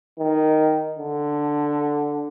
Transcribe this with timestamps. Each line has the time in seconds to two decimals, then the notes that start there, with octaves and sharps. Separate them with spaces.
0.19 D#3
0.98 D3